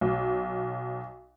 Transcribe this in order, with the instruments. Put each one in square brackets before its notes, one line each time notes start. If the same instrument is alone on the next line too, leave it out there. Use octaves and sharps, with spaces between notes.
[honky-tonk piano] B1